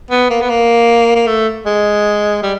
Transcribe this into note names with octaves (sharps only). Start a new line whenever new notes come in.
B3
A#3
B3
A#3
A#3
A3
G#3
G3